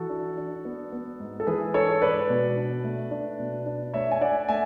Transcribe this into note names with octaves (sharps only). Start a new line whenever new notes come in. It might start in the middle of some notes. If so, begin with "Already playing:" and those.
Already playing: E3 F#4 A4
D4
D4
B3
B3
G#2
A4
E3 G#4 B4
D4 A4 C#5
G#2 B4 D5
B2
D4
A3
D4
B2
D4
A3 C#5 E5
G#5
D4 D5 F#5
A3 E5 G#5